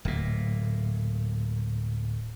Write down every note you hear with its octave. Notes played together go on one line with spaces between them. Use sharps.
D1 A#2